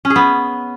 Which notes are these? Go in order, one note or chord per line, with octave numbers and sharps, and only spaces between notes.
C#4
G#4
B3